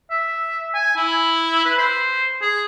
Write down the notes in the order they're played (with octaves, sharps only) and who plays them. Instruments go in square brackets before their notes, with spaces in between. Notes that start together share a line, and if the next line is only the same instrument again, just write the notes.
[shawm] E5
G#5
E4
B4
C5
G#4